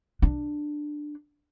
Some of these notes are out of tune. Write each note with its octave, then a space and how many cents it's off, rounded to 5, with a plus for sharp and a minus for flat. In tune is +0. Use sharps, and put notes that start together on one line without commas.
D4 +10